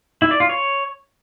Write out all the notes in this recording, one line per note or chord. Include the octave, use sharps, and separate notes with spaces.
E4
D5
F4
C#5